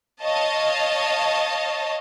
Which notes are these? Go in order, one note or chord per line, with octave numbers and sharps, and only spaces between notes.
C#5 D#5 F5 A5